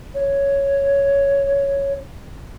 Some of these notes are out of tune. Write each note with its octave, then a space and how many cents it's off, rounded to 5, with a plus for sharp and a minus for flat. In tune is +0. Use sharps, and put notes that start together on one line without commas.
C#5 +5